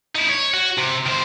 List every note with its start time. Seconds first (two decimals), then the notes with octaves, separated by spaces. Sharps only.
0.15 D#4 E4
0.29 C#5
0.54 F#4
0.78 C3
1.06 D#3 C5